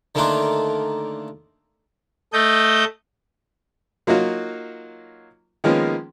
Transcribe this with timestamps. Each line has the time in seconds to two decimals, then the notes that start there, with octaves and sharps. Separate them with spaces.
0.15 D3 D#3 A3 A#3 D4 F4
2.33 A3 A4 D#5 G6
4.07 F#3 A#3 D#4 F4 F#4
5.64 D#3 F3 G#3 A#3 B3 C#4